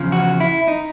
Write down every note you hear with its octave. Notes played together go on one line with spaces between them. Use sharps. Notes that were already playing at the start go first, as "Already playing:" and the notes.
Already playing: E2 C#3 F3
F#4
E4
D#4